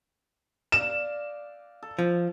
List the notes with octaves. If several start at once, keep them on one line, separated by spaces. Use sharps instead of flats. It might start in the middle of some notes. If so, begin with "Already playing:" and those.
D5 F5 E7
A4
F3